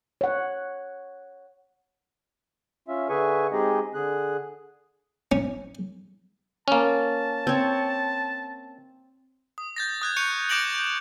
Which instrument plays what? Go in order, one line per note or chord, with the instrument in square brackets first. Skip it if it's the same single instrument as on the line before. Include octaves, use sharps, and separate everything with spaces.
[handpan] C#5 F#5
[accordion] C#4 F4 E5
D3 G#4 B4 E5 G#5 C#6
G#3 C4 D#4 G4 G#4 D#5
D3 G#4 F#6
[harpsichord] C#4
[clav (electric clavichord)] A#3 C#4 [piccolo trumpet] A5
[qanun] C4 C#5
[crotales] D#6
G6 A6 A#6
D#6 F#6 G#6
C#6 F#6 G6 C#7 F7
D6 G6 A#6 D7 F7 F#7
G6